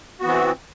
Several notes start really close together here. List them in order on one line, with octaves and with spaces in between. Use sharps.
F#4 B3 E3 C4